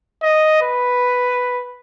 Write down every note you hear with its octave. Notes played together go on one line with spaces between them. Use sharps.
D#5
B4